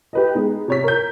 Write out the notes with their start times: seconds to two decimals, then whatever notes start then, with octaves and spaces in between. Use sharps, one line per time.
0.13 G4 B4 D#5
0.35 G#3 B3 D#4
0.68 C3 C#5 B6
0.84 A#4 G6